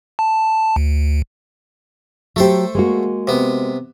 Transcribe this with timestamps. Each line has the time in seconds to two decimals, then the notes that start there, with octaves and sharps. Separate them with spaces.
0.19 A5
0.76 D2
2.36 F#3 A3 G4 A4 C5
2.75 G#3 A#3 F#4
3.27 C3 B3